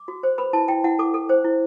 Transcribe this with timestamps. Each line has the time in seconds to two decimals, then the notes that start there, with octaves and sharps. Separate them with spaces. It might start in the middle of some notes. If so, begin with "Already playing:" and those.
Already playing: D6
0.08 F#4
0.23 C5
0.38 B4 B5
0.53 E4 A5
0.68 E4 G5
0.84 E4 F#5
0.99 A4 D6
1.14 A4
1.29 C5
1.44 E4